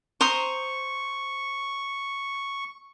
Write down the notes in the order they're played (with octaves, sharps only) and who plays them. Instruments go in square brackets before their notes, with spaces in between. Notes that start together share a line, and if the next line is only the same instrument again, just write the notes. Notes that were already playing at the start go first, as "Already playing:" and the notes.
[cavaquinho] C5 A#5 D#6 [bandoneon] C#6